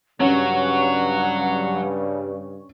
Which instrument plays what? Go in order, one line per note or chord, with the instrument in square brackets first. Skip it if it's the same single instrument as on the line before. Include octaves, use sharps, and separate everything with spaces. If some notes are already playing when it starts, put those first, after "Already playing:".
[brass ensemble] G2 C#3 [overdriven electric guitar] F#3 [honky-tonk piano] C#4 [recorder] F#5